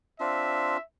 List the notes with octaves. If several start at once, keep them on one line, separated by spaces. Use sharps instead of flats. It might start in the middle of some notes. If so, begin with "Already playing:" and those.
C4 D4 F4 E5